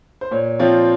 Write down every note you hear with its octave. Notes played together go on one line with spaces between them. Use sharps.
C5
A#2 C#5
F3 C4 F4 C#5